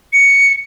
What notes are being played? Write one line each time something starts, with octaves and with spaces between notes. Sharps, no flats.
C#7